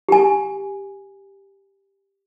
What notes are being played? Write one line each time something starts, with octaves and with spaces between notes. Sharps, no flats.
G4 G#5